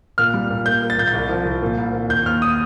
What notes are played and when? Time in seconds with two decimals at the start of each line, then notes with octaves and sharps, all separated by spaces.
0.18 A#2 F6
0.34 G3
0.50 A#2
0.65 A#3 G6
0.82 A#3
0.90 A6
0.98 A#2 G6
1.08 A6
1.13 C2
1.29 F3
1.45 C2
1.62 A#2
1.78 C2
1.93 A#2
2.09 D#2 G6
2.26 D#2 F6
2.42 D#6